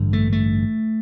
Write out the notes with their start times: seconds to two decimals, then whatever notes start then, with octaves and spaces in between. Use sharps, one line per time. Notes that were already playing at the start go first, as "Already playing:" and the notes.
Already playing: A1 G2 D3
0.13 A3
0.32 A3